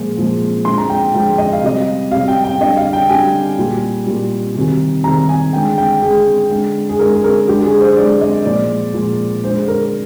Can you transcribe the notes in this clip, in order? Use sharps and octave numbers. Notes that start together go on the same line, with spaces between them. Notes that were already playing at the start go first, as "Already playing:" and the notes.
Already playing: A#2 F3 G#3
A#2 F3 G#3
D3 F3 G#3 C6
A#5
G5
D3 F3 G#3 G5
D#5
F5
C3 G3 D#5
C3 G3 F5
G5
G5
D3 G3 D#5
F5
G5
D3 G3 G#5
A#2 G3
A#2 G3
C3 D#3 G3
C3 D#3 G3 A#5
G#5
D3 G#3 G5
G5
D3 G#3 G#4
D3 G#3
G#4
D3 G#3 A#4
G#4
A#4
D3 G#3 G4
G#4
C5
D3 G#3 D5
D#5
A#2 F3 G#3 D5
A#2 F3 G#3
D3 G#3 C5
A#4